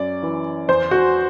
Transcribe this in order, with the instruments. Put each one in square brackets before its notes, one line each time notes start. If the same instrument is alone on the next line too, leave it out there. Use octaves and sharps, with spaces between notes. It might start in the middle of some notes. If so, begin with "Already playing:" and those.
Already playing: [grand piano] F#2 D5
E3
E2 C5
F#4